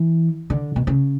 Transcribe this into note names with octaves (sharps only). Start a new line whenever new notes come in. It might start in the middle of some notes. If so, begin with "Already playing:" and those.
Already playing: E3
D3
B2
C#3